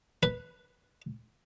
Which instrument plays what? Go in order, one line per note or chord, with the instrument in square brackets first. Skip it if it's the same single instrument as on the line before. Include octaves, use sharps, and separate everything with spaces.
[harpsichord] B4